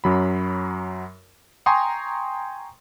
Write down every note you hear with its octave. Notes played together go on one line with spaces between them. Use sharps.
F#2 F#3 B5
G5 G#5 A#5 C6 C#6 D#6